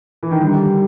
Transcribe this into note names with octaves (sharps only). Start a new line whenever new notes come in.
E3
D#3
D3 G3